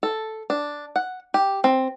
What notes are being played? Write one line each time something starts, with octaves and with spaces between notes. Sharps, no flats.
A4
D4
F#5
G4
C4